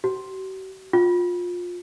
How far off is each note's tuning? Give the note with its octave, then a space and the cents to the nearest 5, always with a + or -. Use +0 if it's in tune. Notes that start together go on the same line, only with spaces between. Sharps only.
F#4 +45
F4 +25